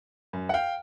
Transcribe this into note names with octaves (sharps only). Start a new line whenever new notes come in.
F#2
F#5
F5 G5